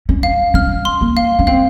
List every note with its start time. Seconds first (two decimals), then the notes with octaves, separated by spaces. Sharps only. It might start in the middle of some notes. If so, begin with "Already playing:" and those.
0.09 C#4
0.23 F5
0.54 C#4 F6
0.85 C6
1.01 A#3
1.17 F5
1.39 C#4
1.47 C4 F5